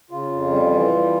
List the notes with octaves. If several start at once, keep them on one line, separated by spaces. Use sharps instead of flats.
C#3 F4
F2
G3
E3
G3